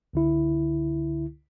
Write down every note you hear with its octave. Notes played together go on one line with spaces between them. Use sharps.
C#2 D3 E4